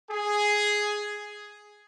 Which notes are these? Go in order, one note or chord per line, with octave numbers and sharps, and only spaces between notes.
G#4